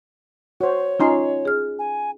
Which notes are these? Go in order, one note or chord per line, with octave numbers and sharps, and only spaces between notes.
F#4 C5 C#5
C#4 D#4 F4 G#5 A#5 C6
G#4 F6
G#5